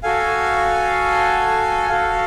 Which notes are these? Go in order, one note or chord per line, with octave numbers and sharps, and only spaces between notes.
F#4 A4 F5 G#5
F#4 A4 F5